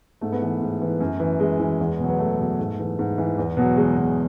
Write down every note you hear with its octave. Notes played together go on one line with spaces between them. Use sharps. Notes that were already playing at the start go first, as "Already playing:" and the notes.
G#2 A3
B3
E3 A3
G#2
E3
F#2
E3
F#2 G#3
E3
E2
B2
F#3
B3
E2 A3
B2 F#3
G#2
E3
G#2
E3
E2
B2 F#3
E2 G#3
B2 F#3